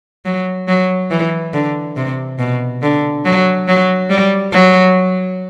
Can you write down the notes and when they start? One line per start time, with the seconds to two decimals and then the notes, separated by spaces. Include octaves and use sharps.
0.25 F#3
0.68 F#3
1.11 E3
1.54 D3
1.96 C3
2.39 B2
2.83 D3
3.25 F#3
3.68 F#3
4.10 G3
4.52 F#3